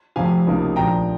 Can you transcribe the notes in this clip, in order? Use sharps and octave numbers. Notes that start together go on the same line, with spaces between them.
F1 F2 C3 F3 F5 G#5
C#2 C3 F3 A#3 D#4
A#1 A#2 F3 G5 A#5